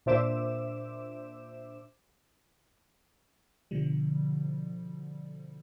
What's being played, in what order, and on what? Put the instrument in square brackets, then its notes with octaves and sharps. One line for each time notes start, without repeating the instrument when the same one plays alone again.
[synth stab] A#2 D4 C5 E5 D6 E7
[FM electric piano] B2 D3 F3 G3